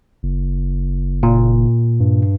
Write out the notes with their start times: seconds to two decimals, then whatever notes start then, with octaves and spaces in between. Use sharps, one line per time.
0.23 F#1
1.23 A#2
2.00 G2